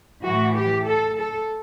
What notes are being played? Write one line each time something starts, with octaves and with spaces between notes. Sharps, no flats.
A2 E3 F#4
G4
A4
A4